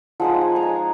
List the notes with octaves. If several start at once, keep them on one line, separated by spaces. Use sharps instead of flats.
F3 G#3 D#4 F#5
G#5
A#5
G#5